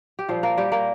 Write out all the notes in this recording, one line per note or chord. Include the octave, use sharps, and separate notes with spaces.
G4
A#2 F3 G3 F4
A#3 A#4
G3 G4
A#3 A#4